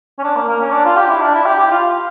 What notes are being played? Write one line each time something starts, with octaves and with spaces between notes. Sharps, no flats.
C#4
D4
A#3
A#3
C#4
D4
F4
G4
E4
D4
E4
G4
G4
F4